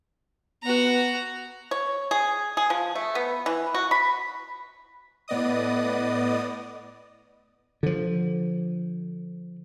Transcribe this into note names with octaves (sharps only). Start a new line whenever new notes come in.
B3 F#4 A#5
C#5
G#4
G#4
F3
A3
B3
E3
F#4
B5
A2 B3 D5 D#5 D#6
D3 F3